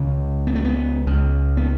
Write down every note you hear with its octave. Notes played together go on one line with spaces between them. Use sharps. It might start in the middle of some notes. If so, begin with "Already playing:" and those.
Already playing: C#2 C#3
B3
A3
B3
C#2 C#3
B3